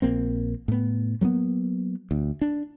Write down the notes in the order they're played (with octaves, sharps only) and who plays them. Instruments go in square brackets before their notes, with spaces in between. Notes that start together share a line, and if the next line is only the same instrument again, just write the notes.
[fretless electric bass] A#1 A#3 C4
A2 B3
F#3 G#3 A#3 B3
D2
D4